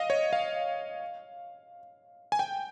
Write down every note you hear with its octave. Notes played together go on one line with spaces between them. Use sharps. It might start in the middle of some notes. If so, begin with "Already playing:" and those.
Already playing: D#5 F5
C#5
F5
G#5
G5